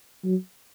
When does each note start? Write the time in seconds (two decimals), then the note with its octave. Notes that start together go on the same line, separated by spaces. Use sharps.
0.24 F#3